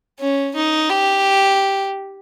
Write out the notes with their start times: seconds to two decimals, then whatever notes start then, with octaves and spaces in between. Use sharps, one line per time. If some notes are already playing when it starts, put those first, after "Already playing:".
0.20 C#4
0.55 D#4
0.90 G4